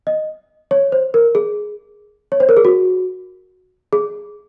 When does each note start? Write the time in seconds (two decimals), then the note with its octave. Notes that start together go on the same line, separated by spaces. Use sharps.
0.07 D#5
0.71 C#5
0.92 C5
1.14 A#4
1.35 G#4
2.32 C#5
2.40 C5
2.49 A#4
2.57 G#4
2.65 F#4
3.93 G#4